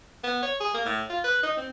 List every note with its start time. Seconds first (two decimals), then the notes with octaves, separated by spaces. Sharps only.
0.24 B3
0.43 C#5
0.60 G#4
0.74 A#3
0.86 A2
1.10 F4
1.24 B4
1.43 D#4
1.57 C4